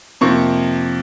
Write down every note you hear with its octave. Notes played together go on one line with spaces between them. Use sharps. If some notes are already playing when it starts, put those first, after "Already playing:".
F2 C3 F3 A#3 C#6